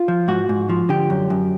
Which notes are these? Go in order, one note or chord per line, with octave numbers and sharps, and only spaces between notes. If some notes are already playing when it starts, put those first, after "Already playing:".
Already playing: F4
F3
G#2 F#4
G#2
F3
D3 G4
F#2
F#2